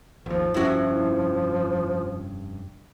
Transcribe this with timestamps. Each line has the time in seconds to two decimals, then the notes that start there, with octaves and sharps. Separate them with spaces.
0.26 G#1 D#2 F3
0.54 F1 G2 F3 C#4 E4 F#4